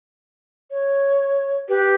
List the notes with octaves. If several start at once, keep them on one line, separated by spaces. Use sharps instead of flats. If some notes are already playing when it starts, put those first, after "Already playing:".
C#5
G4 B4